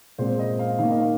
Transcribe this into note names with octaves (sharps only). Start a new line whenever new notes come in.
A#2 G#3 C4 C5
D#5
F5
D#3 A#3 F5
D#5
F5